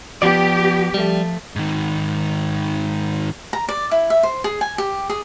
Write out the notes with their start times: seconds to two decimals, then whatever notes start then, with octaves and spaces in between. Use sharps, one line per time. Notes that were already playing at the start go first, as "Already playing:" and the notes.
0.22 F3 B3 G4 D5
0.94 F3 G3 A3
1.56 G#2 D#3
3.53 A#5
3.69 D5
3.91 E4
4.10 E5
4.23 C5
4.44 G#4
4.61 G#5
4.78 G4
5.09 G#4